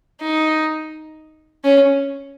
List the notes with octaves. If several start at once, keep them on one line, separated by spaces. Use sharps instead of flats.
D#4
C#4